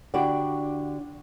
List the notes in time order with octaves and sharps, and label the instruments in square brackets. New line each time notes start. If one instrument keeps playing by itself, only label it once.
[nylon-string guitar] D3 D4 E4 F#4 G4 D5